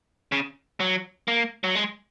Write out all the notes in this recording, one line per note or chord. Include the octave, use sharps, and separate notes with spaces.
C#3
F#3
A#3
F#3
G#3